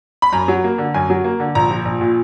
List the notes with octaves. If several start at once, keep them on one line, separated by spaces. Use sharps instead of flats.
B5
F#2 A#5
F#3
A#3
D3
F#2 G#5
F#3
A#3
D3
A#1 A#5
F3
A#1
A#2